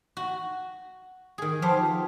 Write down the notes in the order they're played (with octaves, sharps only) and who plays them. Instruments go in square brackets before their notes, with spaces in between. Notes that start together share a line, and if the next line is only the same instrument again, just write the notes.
[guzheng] F#4
D#3 G#4
[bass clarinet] F3 [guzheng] B3 G4 F5
[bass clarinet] F4